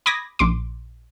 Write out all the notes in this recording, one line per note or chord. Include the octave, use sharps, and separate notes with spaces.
B5 D6 D#6 G#6 A#6
A#1 C6 D6